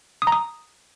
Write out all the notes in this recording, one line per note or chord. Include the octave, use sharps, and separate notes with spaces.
D#6
A#5
D#6